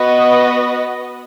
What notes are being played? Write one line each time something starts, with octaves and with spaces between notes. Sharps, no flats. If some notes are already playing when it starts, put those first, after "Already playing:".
Already playing: B3 F#4 B4 D#5